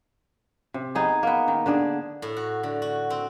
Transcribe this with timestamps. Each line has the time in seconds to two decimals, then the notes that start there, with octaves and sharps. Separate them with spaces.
0.74 C3
0.95 B3 D#4 G#4 A4
1.23 A#3 B3
1.48 D#3
1.66 D3 D4 G#4
2.22 A2
2.36 F#4
2.63 D3
2.82 F#4
3.10 C4